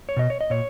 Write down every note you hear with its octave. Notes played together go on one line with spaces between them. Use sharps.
C#5
B2 D#5
C#5
D#5
A#2 C#5